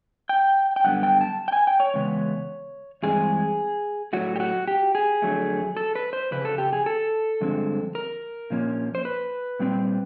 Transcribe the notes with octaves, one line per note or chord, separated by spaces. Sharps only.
G5
G5
F#2 D3 G3 B3 F#5
G5
A5
G5
G#5
G5
C#5
E2 C#3 G#3 B3
G2 E3 G#3 C4 G#4
A2 F#3 A3 F#4
G4
F#4
G4
G#4
F2 D3 F#3 A3
A4
B4
C5
F2 C#3 B4
A4
G4
G#4
A4
G2 D3 F3 G#3 C4
A#4
A#2 F3 A#3 C#4
C5
B4
A#2 G3 C4